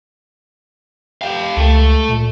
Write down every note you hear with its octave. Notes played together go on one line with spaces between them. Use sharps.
G4 F5
C#2 A3
A#2